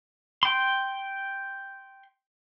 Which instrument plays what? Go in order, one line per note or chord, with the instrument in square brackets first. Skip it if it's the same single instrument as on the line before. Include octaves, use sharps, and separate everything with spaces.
[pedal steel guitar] G5 C6